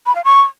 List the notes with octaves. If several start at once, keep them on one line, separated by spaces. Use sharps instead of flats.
B5
F5
C#6